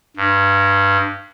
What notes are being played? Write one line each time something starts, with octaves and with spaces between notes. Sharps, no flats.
G2